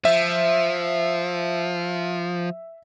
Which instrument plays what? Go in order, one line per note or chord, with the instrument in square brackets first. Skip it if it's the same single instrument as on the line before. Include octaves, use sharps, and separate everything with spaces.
[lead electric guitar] F3 [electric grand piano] E5